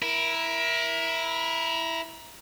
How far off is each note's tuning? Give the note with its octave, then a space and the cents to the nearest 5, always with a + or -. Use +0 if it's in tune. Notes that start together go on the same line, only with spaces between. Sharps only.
E4 +0 A#4 +25